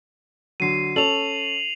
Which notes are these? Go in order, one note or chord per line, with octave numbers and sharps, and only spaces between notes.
D3 F#3 C7 D#7
C#4 A4 F7 F#7